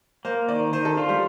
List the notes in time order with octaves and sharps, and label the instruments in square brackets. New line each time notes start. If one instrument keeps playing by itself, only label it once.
[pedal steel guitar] A#3 [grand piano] C5
[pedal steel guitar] D#3 [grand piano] D5
[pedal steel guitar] D#3 [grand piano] C5
[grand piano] A4
[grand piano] D4 [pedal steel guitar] F4
[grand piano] G3